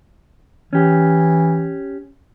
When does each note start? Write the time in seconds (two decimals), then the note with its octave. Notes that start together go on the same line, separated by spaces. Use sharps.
0.73 E3 C#4 G4